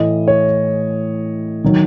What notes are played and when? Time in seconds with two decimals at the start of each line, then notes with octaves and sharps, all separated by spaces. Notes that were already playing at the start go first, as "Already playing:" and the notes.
Already playing: A2 E3 D#5
0.28 C#5
1.64 D#3 F#3